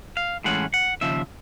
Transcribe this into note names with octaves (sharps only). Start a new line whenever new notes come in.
F5
A2 E3 G#3 C#4 F#5
F#5
D#2 C#3 F3 E5